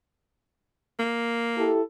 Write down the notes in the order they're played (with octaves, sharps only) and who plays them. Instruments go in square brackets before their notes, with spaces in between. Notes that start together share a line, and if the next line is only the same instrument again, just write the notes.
[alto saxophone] A#3
[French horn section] E4 G4 A4